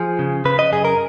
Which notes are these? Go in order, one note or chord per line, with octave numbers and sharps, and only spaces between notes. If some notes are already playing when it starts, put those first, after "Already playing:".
Already playing: F3 G#4
C#3
C#3 B4
D#5
F#2 G#4
A#4